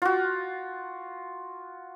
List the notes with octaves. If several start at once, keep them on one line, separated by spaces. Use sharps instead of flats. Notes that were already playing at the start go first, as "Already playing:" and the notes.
F4 F#4